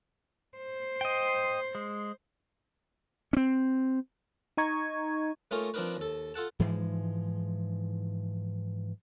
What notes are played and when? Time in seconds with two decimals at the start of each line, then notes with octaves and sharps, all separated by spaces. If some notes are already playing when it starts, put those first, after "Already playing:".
0.57 C5
1.01 D#5 G5
1.75 G#3
3.33 C4 C#4
4.57 D#4 D#5 A#5 C#6 G#6
5.51 A3 A#3 C#4 D#4 F4 A#4
5.74 F3 C4 D4 D#4 A#4 B4
5.97 D#2 A4
6.34 F4 A4 F#5 A5
6.59 G#2 E3 F3 G#3